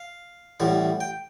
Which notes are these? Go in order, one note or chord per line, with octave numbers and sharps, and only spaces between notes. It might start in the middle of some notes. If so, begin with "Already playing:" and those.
Already playing: F5
A1 A2 E3 G3 F#5
G5